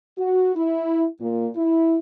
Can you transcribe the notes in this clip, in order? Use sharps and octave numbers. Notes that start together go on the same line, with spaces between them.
F#4
E4
A#2
E4